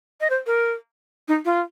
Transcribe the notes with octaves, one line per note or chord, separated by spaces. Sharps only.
D#5
C5
A#4
D#4
F4